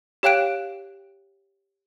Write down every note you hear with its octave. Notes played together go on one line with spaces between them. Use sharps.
G4 C#5 F5 G5 F#6 D7